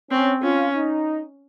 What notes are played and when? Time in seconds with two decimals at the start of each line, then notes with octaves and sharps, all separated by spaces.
0.11 C4 C#4
0.43 C#4 F4
0.75 D#4